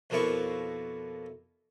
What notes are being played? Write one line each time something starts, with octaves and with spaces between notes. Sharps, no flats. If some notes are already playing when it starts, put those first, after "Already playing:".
F2 B2 F3 A#3 E4 C#6